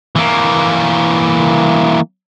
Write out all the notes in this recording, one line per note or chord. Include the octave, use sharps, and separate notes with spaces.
E3 A#3